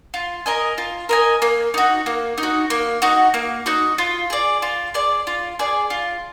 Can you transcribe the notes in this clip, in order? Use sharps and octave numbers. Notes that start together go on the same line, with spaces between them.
F4
A#4 D#5 G#5
F4
A#4 D#5 G#5
A#3
D#4 F#4
A#3
D#4
F#4
A#3
D#4 F#4
A#3
D#4 F#4
F4
G#4 D5
F4
G#4 D5
F4
G#4 D5
F4